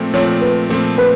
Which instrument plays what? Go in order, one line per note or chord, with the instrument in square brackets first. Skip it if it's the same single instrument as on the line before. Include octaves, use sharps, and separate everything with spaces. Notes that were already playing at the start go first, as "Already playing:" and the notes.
Already playing: [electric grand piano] A#2 F3 A3 C4
[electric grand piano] A#2 F3 A3 C4 [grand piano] C#5
[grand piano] B4
[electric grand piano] A#2 F3 A3 C4 [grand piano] C5
[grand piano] B4